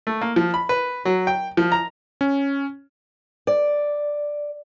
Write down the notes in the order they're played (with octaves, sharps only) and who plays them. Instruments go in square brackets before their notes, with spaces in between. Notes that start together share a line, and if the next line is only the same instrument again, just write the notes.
[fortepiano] A3
A#3
F3
B5
B4
F#3
G5
F3
A#5
[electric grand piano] C#4
[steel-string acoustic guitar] D5